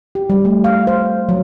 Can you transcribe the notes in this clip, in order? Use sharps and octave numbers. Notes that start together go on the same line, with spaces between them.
G4
G3
A3
F5
C5
F#3